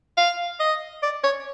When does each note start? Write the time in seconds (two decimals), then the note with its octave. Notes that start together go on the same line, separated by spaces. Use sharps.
0.17 F5
0.60 D#5
1.03 D5
1.24 C#5